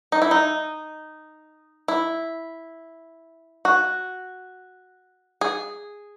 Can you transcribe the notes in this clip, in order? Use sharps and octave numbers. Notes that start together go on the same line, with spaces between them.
D#4
E4
D#4
E4
F#4
G#4